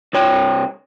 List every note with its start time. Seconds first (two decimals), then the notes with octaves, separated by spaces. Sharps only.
0.13 C2 C3 C#5 G5